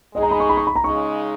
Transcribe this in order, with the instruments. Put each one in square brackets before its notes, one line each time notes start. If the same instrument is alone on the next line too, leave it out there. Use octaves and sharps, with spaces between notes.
[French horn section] G#3 D#4 G#4 [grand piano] D#5
[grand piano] A#5
B5
C#6
B5
C#6
B5
A#5
[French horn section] C#3 G#3 D#4 [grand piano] C#6